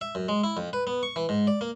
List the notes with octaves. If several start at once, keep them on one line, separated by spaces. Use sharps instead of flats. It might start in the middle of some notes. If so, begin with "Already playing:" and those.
E5
F#2
G#3
E4
F2
B4
B3
C#6
E3
G#2
D5
A#3